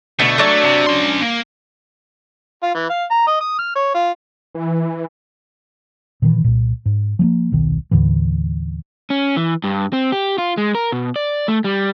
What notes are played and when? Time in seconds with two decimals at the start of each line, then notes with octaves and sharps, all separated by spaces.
0.19 B2 D3 A3
0.38 F#3 D4 D5
0.64 C3
0.86 C#4 C6
1.22 A#3
2.63 F4
2.74 E3
2.90 F5
3.11 A#5
3.27 D#5
3.40 D#6
3.59 F6
3.76 C#5
3.95 F4
4.55 E3
6.22 A#2 D#3 E3
6.44 C2 A#2
6.86 G#2
7.19 F3 G#3 A#3
7.51 D#1 B1 D#3
7.91 D#2 A2 D3 E3
9.10 C#4
9.37 E3
9.64 G2
9.93 C4
10.12 G4
10.38 F4
10.57 G#3
10.75 A#4
10.92 B2
11.16 D5
11.48 A3
11.64 G3